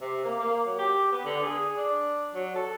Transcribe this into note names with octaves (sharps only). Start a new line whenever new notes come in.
C3
A#3
A#3
F#3
G4
B3
D3
G#4
D4
F#3
A4